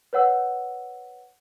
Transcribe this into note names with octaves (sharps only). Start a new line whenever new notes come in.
B4 C#5 F#5 E6